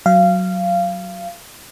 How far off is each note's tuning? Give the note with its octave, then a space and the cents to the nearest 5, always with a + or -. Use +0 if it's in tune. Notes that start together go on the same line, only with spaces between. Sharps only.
F#3 +0 F5 -20